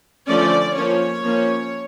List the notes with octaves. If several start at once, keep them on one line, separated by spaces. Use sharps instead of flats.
D3 F3 A3 C#4 D5
F3 A#3 C#4 C#5
F3 A#3 C#4